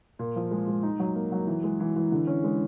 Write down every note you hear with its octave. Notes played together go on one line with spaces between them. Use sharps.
A#2
F3
G#3
G#3
D#4
F#3
A#3
F#3
E3
G#3
E3
E3
D3
C#4
G#3